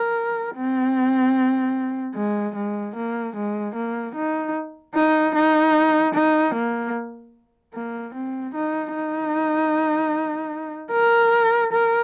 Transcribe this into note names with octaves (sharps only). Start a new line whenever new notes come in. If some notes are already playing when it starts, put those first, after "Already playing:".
Already playing: A#4
C4
G#3
G#3
A#3
G#3
A#3
D#4
D#4
D#4
D#4
A#3
A#3
C4
D#4
D#4
A#4
A#4